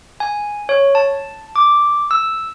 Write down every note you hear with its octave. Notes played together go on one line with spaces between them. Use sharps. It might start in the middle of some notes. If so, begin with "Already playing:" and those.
G#5
C#5
A5
D6
E6